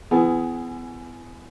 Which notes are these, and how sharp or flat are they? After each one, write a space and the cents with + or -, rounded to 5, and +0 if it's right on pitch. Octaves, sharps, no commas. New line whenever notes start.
E3 +25 B3 +30 G#4 +0